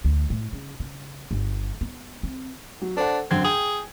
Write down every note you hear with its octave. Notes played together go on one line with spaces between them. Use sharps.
D2
A2
C#3
C#3
G1
B3
C4
F#3
D4 A4 C5 F#5
F#2 D3 C4 G#6
G#4 G5